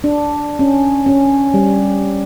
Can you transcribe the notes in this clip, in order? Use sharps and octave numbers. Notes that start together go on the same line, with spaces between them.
D4
C#4
C#4
G3